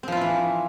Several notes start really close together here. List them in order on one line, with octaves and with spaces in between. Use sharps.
C4 F3 F4 E4 E3